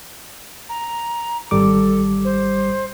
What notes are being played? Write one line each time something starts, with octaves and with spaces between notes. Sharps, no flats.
A#5
G#1 G3 A4 D6
C5